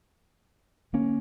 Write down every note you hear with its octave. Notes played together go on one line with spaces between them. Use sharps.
D3 A#3 C#4